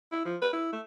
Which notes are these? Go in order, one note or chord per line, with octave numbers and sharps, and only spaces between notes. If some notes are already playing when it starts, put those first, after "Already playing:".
E4
F3
B4
E4
A3